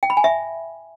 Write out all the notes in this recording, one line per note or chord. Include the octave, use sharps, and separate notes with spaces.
G5
B5
G#5
E5